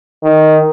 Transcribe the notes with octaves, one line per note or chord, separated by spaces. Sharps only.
D#3